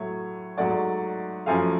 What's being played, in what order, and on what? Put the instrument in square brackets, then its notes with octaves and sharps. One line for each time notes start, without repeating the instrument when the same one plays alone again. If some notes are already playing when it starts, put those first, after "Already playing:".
Already playing: [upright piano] A2 F#3 A3 C#5
G#2 F#3 A3 D5 F#5
F#2 F3 A3 F5 G#5